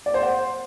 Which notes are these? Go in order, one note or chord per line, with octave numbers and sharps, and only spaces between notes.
D5
C5
F#5